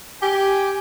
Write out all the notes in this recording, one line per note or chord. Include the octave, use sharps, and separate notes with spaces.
G4 G#5